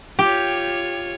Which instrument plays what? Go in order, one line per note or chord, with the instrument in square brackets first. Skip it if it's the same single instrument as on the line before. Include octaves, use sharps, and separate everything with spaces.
[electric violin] F4 C#5 [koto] G4